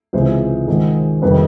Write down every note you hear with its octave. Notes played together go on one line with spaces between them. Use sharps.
C#2 C3 E3 G#3 C5
G#2 D#3 G#3
F2 C3 D#3 G3 A#3 B4